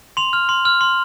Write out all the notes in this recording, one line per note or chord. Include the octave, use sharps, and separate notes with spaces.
C6 F7
F6
C6
F6
C6